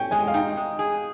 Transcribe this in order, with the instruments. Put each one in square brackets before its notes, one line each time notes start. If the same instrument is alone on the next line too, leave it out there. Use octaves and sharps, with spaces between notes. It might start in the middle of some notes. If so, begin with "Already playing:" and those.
Already playing: [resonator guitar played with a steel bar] C#4 [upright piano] G5
[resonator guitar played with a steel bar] G#3 [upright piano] G#5
[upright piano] F5
[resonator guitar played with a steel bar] D#4 [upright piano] G5
[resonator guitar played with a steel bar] G#3
G#4